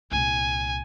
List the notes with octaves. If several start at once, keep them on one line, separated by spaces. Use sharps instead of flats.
C2 A#2 G#5